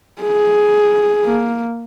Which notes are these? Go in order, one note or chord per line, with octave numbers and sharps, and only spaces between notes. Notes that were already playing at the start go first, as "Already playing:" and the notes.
G#4
A#3